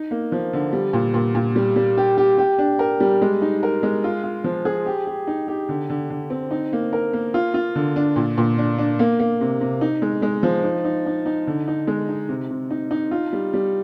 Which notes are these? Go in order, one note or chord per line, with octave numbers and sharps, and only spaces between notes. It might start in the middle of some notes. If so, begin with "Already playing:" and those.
Already playing: D#4
A#3
F3
D3
G3
A#2
A#2
A#2
G3
G3
G4
G4
G4
D4
A#4
G3
G#3
D#4
A#4
G#3
F4
F4
F3
G#4
G4
G4
D#4
G4
D3
D3
D3
C4
D#4
A#3
A#4
A#3
F4
F4
D3
D4
A#2
A#2
D4
D4
A#3
A#3
C3
C3
D#4
G#3
G#3
F3
D#4
D#4
D#4
D#4
D3
D#4
G#3
D#4
C3
C3
D#4
D#4
F4
G3
G3